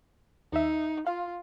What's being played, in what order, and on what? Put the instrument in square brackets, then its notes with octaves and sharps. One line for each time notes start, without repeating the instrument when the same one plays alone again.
[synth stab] D#2 E5 [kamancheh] D#4
[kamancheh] F4 [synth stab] F5